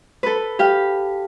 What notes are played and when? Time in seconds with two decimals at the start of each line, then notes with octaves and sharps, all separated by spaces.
0.23 A4 B4
0.59 G4 F5